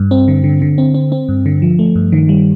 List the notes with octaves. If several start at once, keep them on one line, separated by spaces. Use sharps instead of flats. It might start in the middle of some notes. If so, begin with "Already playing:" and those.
Already playing: G2
C4
D3
D3
D3
C4
C4
C4
G2
D3
F3
A3
G2
D#3
G3